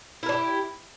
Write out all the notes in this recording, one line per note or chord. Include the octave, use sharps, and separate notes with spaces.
D4 E4 G4 A#4